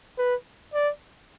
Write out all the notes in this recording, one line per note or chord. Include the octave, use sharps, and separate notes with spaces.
B4
D5